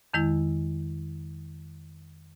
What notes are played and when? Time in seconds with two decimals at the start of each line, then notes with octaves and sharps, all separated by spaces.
0.14 F2 D#3 G#3 E4